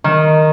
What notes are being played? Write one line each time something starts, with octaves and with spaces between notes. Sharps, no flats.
D#3